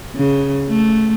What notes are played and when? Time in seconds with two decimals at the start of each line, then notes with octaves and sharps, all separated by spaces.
0.15 C#3
0.69 A3